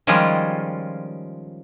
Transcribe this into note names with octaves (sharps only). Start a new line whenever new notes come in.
D#3 F3 G3 G#3 C#4 F4